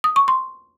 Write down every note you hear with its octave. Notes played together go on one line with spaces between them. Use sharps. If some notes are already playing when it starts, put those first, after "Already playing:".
D#6
C#6
C6